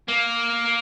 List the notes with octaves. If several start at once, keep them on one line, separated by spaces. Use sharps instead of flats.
A#3